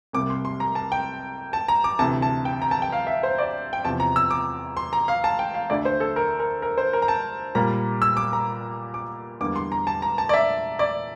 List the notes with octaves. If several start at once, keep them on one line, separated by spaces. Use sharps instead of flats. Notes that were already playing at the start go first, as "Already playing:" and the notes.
C2 C3 G3 A#3 D6
C6
C6
A#5
A5
G5
A5
A#5
D6
D2 C3 E3 A5
A5
G5
A#5
A5
G5
F5
E5
C5
D5
G5
E2 C3 F3 A5
A#5
E6
D6
C6
A#5
F5
A5
G5
F5
D2 D3 A3 D5
C5
A4
A#4
A#4
A#4
C5
A#4
A#5
A5
A#2 G3 A#3 A#5
E6
D6
A#5
D6
E2 D3 G3 A#3 D6
C6
A#5
A5
A#5
A5
D5
E5
D5